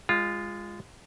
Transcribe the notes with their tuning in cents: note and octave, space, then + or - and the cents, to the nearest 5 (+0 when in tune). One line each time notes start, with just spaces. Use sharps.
G#3 -20 F4 +0